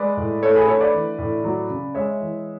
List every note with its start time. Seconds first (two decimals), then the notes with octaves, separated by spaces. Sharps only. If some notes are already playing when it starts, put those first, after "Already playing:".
Already playing: G#3 B4 D5
0.17 A2
0.43 A3 A4 C#5
0.55 G#4 B4
0.68 D3 A4 C#5
0.80 B4 D5
0.93 E3
1.19 A2
1.44 F#3
1.70 C#3
1.94 G#3 C#5 E5
2.21 E3